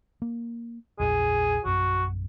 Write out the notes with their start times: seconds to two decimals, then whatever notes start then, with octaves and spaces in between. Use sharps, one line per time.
0.22 A#3
0.99 A#1 E2 A#2 G#4
1.65 A#1 F#2 F#4